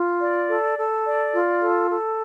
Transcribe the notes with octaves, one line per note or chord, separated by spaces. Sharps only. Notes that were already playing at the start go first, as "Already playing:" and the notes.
Already playing: F4
D5
A4
A4
D5
F4
A4
A4